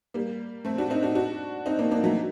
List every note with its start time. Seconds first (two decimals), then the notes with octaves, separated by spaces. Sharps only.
0.14 G3 A#3
0.65 A3 C4
0.78 D4 F#4
0.90 C4 D#4
1.03 D4 F#4
1.15 D4 F#4
1.66 C4 D#4
1.79 A#3 D4
1.91 A#3 D4
2.04 F#3 A3